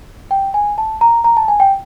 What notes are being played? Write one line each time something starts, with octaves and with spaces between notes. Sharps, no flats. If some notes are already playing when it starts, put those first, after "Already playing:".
G5
G#5
A5
A#5
A#5
A5
G#5
G5